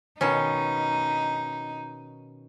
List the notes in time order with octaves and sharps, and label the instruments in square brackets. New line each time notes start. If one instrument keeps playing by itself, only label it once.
[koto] B2 D#3 C#4 [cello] D#4